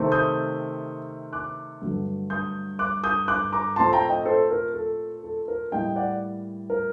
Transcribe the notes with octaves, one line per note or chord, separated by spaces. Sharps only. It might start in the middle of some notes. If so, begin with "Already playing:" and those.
Already playing: C3 D#3 A3 C4
D#6 G6
D6 F#6
G2 D3 F#3 A3
D#6 G6
D6 F#6
D#6 G6
D6 F#6
A#5 D6
A#2 A3 C4 A5 C6
A5
G5 A#5
D#5 G5
A4 C5
A#4
A4
A4
A#4
A2 G3 A#3 D#5 G5
D5 F#5
A#4